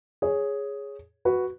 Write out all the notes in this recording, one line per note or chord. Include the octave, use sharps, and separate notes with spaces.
G#4 C#5
F#4 B4